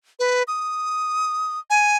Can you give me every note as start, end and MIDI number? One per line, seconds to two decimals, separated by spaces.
0.19 0.43 71
0.48 1.59 87
1.70 1.97 80